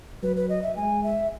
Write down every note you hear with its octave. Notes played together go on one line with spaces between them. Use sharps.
F#3 B4
B4
D#5
E5
G#3 G#5
E5